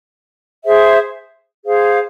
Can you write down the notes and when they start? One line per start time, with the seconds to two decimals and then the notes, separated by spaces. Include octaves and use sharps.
0.64 G#4 C5 E5
1.64 G#4 C5 F5